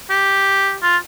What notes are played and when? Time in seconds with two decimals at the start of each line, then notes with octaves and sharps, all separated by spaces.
0.10 G4
0.83 F4